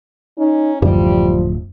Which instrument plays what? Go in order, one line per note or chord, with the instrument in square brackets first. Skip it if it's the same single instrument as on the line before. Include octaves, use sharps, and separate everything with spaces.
[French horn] C#4 [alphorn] D#4
[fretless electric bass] D1 [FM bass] F#2 [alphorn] F3 [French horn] G3